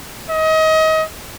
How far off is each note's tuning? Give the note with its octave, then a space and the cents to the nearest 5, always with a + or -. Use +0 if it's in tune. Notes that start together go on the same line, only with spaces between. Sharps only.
D#5 +30